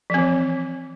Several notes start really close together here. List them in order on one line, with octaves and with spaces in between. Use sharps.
F3 C4 E3